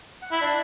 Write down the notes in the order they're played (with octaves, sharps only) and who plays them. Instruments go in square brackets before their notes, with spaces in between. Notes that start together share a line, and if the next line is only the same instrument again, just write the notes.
[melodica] F#5
[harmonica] E4 [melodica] E5
[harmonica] D4